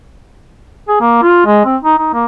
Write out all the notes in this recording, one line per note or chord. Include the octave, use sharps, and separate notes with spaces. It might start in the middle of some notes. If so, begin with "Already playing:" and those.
G#4
A#3
F4
G#3
C4
D#4
D#4
A#3